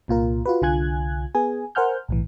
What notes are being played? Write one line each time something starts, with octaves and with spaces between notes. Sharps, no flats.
C2 A#2 F4 A#4
F4 F#4 B4
C2 D3 F4 G#5 F#6 G#6
B3 G#4 G#5
A#4 C5 F#5 G#5 F6 G6
B1 A2 E3